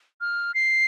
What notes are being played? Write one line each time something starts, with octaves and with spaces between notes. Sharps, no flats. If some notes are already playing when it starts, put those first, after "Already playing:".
F6
C7